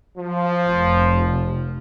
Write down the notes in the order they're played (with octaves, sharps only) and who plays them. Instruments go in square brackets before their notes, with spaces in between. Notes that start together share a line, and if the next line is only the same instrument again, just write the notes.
[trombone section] F3
[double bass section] F1